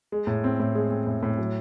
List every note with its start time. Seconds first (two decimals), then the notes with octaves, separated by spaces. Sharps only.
0.12 G#3
0.27 A2
0.44 C4
0.60 A2
0.75 G#3
0.91 C4
1.07 A2
1.23 A2
1.38 F#3